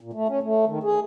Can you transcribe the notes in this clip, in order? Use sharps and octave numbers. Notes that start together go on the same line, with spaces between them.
A#2
A3
C#4
A3
D#3
G#4